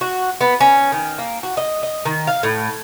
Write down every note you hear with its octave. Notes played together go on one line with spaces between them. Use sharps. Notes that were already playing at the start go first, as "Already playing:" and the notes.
F#4
B3
C#4
D#3
A#3
F#4
D#5
D#5
D#3
F5
A2